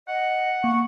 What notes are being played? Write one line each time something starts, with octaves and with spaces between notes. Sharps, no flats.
D#5 F#5
A#3 C#6